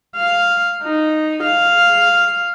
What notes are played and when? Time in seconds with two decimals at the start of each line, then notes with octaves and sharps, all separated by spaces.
0.16 F5
0.83 D#4
1.43 F5